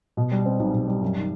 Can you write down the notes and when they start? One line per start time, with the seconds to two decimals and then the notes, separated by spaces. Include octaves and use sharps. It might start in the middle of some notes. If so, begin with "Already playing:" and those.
0.17 B2
0.32 G3
0.46 C4
0.59 B1
0.74 B2
0.88 G3
1.01 F#2
1.17 D#3